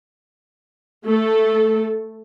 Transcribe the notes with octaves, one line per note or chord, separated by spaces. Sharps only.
A3 A4